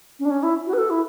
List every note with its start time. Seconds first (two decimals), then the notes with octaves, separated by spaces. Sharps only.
0.19 C#4
0.25 D4
0.30 C#4
0.43 E4
0.67 F#4
0.73 B4
0.78 A4
0.90 E4